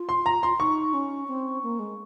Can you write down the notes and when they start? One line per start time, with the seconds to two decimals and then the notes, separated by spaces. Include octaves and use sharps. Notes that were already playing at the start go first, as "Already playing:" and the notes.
Already playing: F4
0.09 C6
0.26 A#5
0.43 C6
0.60 D#4 C#6
0.93 C#4
1.28 C4
1.63 A#3
1.79 G#3